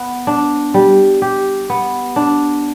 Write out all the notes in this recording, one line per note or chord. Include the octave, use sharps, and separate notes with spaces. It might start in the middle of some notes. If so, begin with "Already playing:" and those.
Already playing: B3
D4
G3
G4
B3
D4